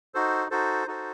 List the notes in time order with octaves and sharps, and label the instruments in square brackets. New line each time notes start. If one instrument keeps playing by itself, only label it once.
[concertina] D#4 F#4 A4 C5
D#4 F#4 A4 C5
D#4 F#4 A4 C5